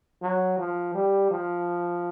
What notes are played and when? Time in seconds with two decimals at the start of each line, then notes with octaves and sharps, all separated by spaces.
0.22 F#3
0.58 F3
0.94 G3
1.31 F3